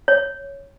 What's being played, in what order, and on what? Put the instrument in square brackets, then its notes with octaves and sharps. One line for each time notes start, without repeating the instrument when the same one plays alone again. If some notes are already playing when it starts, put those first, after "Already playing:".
[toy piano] C#5